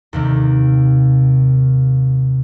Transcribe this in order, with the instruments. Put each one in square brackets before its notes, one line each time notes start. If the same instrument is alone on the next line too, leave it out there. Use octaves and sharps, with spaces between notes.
[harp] D#2 C3 D#3